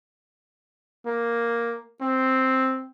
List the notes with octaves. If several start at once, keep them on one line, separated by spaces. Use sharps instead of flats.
A#3
C4